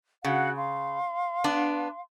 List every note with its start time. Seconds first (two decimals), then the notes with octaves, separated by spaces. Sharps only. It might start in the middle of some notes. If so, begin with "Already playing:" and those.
0.24 C#3 F#4 F5 F#5
0.57 F5 C6
1.44 B3 D4